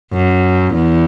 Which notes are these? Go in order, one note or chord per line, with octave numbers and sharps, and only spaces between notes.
F#2
E2